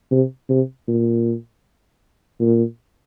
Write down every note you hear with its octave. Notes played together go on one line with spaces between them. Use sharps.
C3
C3
A#2
A#2